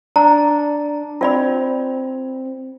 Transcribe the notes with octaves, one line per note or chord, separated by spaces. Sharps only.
D4 A#5
C4 F4 D5 B5